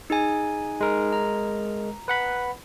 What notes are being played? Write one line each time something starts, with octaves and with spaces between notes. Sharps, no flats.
D#4 G#4 G#5
G#3 A#4
A#5
B4 F#5 B5